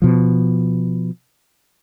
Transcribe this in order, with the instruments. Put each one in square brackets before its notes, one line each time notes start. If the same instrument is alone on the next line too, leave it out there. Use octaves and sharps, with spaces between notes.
[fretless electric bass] B2 F3